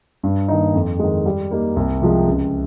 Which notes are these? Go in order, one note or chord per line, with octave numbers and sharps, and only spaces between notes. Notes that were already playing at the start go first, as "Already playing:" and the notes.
G2
D#3 A#3 D#4
F2
D#3 G#3
G3
A#3 D#4 G4
C2
C3 F3 G#3
C#2